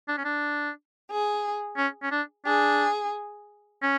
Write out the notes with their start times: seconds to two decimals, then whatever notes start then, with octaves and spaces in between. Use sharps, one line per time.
0.08 D4
0.18 C#4
0.24 D4
1.10 G#4
1.77 C#4
2.03 C#4
2.11 D4
2.46 D4 G#4
3.82 C#4